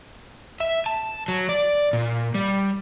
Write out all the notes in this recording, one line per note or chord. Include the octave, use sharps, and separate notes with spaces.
E5
A5
F#3
D5
A#2
G3